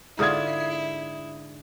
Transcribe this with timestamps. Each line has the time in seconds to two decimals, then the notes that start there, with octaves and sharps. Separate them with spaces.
0.19 G#2 D3 E4 F4 D#6 G#6